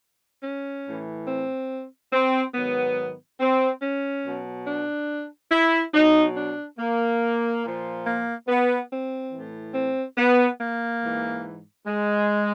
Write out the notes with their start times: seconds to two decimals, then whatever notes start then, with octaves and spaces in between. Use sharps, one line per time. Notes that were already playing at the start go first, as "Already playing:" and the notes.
0.43 C#4
0.85 A2 E3
1.28 C4
2.13 C4
2.55 G#2 D#3 F#3 B3
3.40 C4
3.82 C#4
4.25 B2 F#3
4.66 D4
5.51 E4
5.94 B2 F#3 D#4
6.36 D4
6.79 A#3
7.64 A#2 F3
8.06 A#3
8.48 B3
8.90 C4
9.32 A2 E3
9.75 C4
10.18 B3
10.60 A#3
11.03 G#2 E3
11.86 G#3